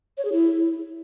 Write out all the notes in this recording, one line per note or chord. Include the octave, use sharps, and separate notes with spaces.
C#5
G#4
E4